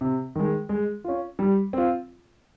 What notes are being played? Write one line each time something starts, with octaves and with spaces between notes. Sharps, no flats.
C3
D#3 G#3
G#3
C#4 F4
G3
C4 F4